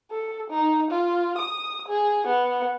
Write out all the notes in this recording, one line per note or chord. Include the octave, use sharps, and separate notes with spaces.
A4
D#4
F4
D#6
G#4
B3